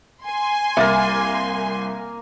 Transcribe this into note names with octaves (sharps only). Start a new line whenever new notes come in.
G#5 C6
C2 A#3 A#4 E5 A6